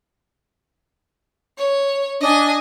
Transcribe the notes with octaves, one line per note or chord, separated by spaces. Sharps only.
C#5
D4 D#5 G#5